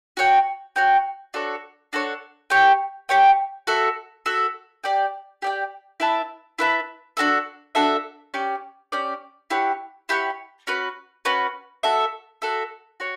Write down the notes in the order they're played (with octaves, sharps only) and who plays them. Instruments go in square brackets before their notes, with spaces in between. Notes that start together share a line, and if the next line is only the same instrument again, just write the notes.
[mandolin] F#4 C#5 G5
F#4 C#5 G5
D4 F#4 A4 C#5
D4 F#4 A4 C#5
G4 C#5 G5
G4 C#5 G5
F#4 A4 E5
F#4 A4 E5
G4 D5 G5
G4 D5 G5
E4 B4 E5 A5
E4 B4 E5 A5
D4 F#4 A4 E5
D4 F#4 A4 E5
C#4 G4 D5
C#4 G4 D5
E4 G4 C#5 F#5
E4 G4 C#5 F#5
C#4 F#4 B4
C#4 F#4 B4
F#4 A4 E5
F#4 A4 E5
F#4 C#5